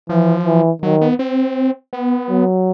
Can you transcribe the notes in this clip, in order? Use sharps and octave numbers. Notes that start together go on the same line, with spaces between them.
E3 F3
E3
D#3 F#3
B3
C4
B3
F#3